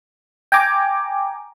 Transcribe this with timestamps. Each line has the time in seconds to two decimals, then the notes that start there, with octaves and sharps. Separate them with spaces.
0.52 G5 G#5 A#5 D6